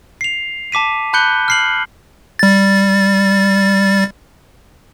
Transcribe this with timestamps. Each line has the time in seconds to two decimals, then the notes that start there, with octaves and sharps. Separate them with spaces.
0.21 C7 F7
0.72 A5 D6 B6 D#7
1.13 A5 B5 F#6 G6 C#7 G7
1.48 F6 C7 F#7
2.39 G3 A6